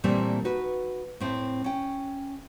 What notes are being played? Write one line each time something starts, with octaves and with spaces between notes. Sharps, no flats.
A#2 E3 G3 A3 A#3 C4
D#4 F#4 B4
A2 C4 E4 A4
C#4 G5